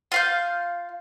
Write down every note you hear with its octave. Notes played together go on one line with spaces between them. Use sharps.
F4 F5 G6